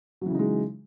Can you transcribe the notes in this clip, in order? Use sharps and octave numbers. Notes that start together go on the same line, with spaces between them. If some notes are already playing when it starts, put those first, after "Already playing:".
C#3 E3 F#3 G#3 D#4